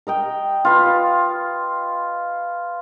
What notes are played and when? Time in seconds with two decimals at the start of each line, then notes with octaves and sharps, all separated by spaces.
0.07 A#4 D#5 G5
0.65 F4 B4